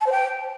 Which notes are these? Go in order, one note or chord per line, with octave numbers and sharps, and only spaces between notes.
A5
C5
G5